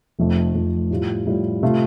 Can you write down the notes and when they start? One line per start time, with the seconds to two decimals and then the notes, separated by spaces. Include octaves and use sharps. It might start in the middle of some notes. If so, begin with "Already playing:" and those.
0.19 F1 F2 F3 A3
0.54 F1 F2 F3 A3
0.91 A2 G3 F4
1.27 A2 G3 F4
1.62 C3 A3 F4